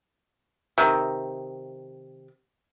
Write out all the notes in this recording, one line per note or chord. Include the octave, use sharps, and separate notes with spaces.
C3 D#3